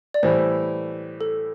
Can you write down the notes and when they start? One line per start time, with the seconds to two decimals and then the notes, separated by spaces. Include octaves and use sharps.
0.14 D5
0.23 A2 E3 G3 C5
1.21 A4